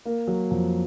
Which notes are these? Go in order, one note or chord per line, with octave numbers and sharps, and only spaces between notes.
A#3
F#3
F2